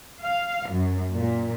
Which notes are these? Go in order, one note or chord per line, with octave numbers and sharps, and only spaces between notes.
F5
F#2
A#2